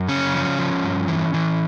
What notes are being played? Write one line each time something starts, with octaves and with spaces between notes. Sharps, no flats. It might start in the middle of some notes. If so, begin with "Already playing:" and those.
Already playing: F#2
C#3 C#4
F3
F3
G2
E3
E3